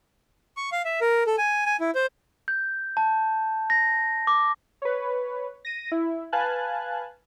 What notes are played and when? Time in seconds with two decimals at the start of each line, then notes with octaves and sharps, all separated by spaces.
0.57 C#6
0.72 F5
0.85 E5
1.01 A#4
1.27 A4
1.38 G#5
1.66 G#5
1.80 E4
1.95 C5
2.48 G6
2.97 A5
3.70 A#6
4.27 D6
4.82 B4 C#5
5.65 A#6 D#7
5.92 E4
6.33 B4 F5 G#5 A5 F#6